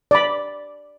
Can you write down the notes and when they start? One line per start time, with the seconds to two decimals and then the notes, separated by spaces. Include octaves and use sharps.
0.11 D5 B5